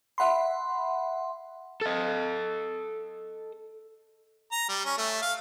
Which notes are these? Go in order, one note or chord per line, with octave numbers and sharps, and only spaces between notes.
E5 F#5 B5 C6
A4 D#5
A#5
G3
C#4
A3
F5